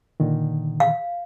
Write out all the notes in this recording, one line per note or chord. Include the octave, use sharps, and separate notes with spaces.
A#2 D3 D#3
F5